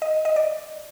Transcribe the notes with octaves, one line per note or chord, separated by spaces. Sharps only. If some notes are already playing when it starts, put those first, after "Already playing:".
D#5
D#5
D5